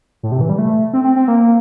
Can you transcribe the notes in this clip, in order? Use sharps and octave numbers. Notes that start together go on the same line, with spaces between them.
A2
C3
E3
G3
A3
C4
C4
C4
A#3